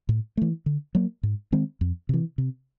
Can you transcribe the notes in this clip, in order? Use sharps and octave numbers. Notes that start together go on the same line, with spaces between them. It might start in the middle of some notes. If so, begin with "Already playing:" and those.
A2
E3 A3
D3
F#3 A#3
G#2
D#3 G#3 C4
F2
C3 E3
C3